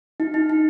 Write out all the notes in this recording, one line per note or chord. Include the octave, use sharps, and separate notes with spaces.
D#4
D#4
D#4